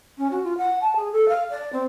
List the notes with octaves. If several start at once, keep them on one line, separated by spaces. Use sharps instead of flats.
C#4
F#4
F4
F#5
A5
G#4
A4
F5
D5
C4